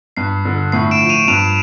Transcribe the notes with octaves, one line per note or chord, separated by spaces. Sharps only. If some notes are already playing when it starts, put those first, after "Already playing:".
G2 C7
D3
A2 C7
D7 E7
F3
D#7 F7
G2 D#7 F7